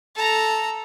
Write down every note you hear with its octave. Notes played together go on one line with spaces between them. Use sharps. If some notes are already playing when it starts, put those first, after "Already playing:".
A4 A#5